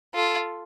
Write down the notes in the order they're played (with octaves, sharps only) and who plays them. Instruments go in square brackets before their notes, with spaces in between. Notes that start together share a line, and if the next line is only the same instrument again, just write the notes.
[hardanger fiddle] F4 [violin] A4